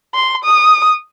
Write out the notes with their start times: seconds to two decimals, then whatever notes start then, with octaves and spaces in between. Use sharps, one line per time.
0.15 C6
0.44 D#6